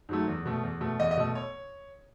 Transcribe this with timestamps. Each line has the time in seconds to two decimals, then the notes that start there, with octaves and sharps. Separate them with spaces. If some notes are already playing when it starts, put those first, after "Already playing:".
0.09 G#2 F#3 A3
0.28 E2
0.45 B2 A3
0.63 E2
0.81 B2 A3
1.00 E2 D#5
1.11 D#5
1.17 B2 A3
1.35 C#5